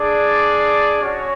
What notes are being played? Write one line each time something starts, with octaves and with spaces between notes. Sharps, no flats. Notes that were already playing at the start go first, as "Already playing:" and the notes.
Already playing: D4 G#4 D5
C#4 F#4 C#5